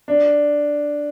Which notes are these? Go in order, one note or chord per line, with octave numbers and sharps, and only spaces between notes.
D4